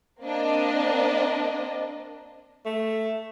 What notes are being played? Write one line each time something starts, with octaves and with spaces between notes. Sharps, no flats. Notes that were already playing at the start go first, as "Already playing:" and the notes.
A#3 C4 D4 D5 D#5
A3